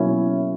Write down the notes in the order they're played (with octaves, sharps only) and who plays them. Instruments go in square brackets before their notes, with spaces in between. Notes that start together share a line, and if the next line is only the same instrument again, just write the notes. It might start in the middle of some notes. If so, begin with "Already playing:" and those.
Already playing: [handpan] B2 F#3 A#3 C#4 E4